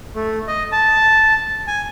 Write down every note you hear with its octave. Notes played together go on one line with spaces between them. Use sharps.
A3
D#5
A5
G#5